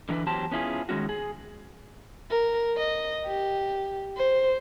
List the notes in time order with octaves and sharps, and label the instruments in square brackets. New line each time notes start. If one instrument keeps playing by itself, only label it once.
[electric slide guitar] D3 E3 D4 B4
E2 F#3 G4 C5 A5
B3 C#4 E4 F4 G#4
D#3 G#3 C#4 F#4
G#4
[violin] A#4
D#5
G4
C5